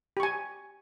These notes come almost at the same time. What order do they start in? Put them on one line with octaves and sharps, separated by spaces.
G4 C#6 G#5